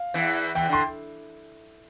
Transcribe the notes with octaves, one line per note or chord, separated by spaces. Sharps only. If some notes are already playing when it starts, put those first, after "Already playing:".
Already playing: F5
E2 E3
E2 E3 G5
D3 C6